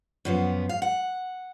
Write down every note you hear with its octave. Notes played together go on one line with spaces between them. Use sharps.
F#2 F3 B3
F5
F#5